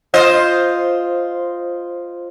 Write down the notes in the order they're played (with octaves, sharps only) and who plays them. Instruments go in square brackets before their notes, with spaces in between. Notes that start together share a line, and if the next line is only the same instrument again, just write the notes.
[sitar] F4 C5 D#5